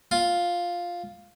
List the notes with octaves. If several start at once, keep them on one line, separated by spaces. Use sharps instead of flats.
F4